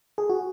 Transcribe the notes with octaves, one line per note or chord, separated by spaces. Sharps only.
G#4
F#4